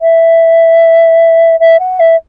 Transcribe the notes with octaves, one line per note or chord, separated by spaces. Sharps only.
E5
E5
F#5
E5